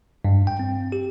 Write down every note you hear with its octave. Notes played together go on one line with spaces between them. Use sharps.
G2
G5
C4
G4